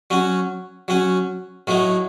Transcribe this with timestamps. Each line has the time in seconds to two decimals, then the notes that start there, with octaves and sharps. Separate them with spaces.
0.10 F#3 C#4 F#4
0.88 F#3 C#4 F#4
1.67 A2 F#3 A3 D#4 F#4